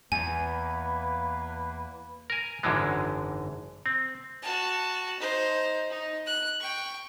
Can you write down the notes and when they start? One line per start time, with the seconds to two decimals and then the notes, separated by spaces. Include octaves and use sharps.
0.12 E2 A#3 B4 G#5
2.30 A#4 G#5
2.63 G#1 F#2 D3 E3 G#3
3.86 C4
4.42 F#4 A5
5.19 D#4 C5
5.90 D#4
6.26 F#6
6.60 G5 C#6